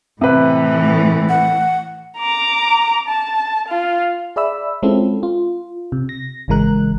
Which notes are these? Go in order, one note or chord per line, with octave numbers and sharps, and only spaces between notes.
A2 C3 E3 B4
F#5
A#5 D6
A5
F4
G#4 D5 E5 B5 E6
G#3 C4 C#4 E4 F4 A4
F4
C3
A#6
G#1 C#3 E3 G#3 A#4 F#6